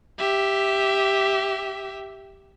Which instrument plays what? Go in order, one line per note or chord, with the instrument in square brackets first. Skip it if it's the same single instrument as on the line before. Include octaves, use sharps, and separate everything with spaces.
[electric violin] G4 E5